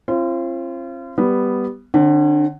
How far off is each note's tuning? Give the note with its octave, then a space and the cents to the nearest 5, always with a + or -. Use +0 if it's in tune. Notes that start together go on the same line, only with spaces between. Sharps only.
C4 +35 F4 -35
G3 +0 B3 +0
D3 +25 C#4 -40